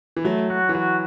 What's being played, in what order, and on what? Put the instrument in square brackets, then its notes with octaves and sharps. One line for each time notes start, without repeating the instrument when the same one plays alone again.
[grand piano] E3
[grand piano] F#3 [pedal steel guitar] A3
[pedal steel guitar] F#4
[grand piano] E3
[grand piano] F#3 [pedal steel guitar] F#4